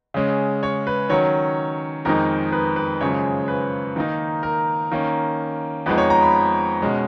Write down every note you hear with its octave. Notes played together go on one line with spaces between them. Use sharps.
C#3 G#3 C#4
C#5
B4
D#3 F#3 C#4 C#5
F2 D#3 G#3 D#4 A#4
B4
B4
F#2 C#3 F3 G#3 C#5
B4
D#3 A#3 D#4
A#4
D#3 A#3 C#4
F2 F3 G#3 B3 D#4 B4
C#5
A#5
B5
B2 G#3 C#4